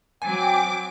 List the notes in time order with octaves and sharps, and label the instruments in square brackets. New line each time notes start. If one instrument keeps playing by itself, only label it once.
[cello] F#3 C4 [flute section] G5 [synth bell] G#5 [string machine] D6